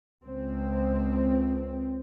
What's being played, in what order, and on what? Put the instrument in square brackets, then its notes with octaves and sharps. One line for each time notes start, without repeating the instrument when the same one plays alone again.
[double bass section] C#2 C4